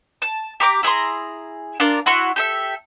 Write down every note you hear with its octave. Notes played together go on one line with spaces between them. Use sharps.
A5
G4 A#5 D6
E4 G#4 A#5 C6
D4 F4 A#4
E4 F#4 C6 C#6
G4 A4 E5